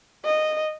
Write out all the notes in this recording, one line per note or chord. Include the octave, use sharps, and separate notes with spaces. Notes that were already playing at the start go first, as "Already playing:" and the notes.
D#5